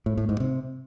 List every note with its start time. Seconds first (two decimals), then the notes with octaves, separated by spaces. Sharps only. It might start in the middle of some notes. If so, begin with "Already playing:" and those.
0.06 A2
0.17 A2
0.29 G#2
0.40 C3